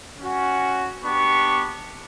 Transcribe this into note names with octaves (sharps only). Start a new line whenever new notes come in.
C#4 F#4
B3 D4 G4 C#6